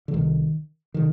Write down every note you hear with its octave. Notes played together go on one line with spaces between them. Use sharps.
D3
C2 C3 D#3
C3 D#3